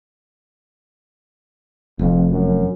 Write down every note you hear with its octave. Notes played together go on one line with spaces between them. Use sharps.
F1 F2
F#2